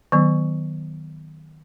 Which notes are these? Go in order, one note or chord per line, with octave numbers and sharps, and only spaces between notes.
D#3 F#3 B3